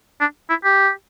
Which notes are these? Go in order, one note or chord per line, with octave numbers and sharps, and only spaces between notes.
D4
E4
G4